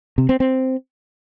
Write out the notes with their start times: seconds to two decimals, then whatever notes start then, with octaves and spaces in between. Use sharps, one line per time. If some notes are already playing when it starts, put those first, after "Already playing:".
0.18 C3
0.29 C4
0.40 C4